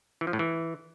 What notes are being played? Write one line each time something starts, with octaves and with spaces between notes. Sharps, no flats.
E3
F3
A2
E3